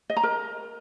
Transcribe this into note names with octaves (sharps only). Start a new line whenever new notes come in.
D#5
A#5
A#4